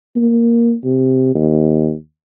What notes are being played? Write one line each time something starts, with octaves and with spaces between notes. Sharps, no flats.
A#3
C3
D#2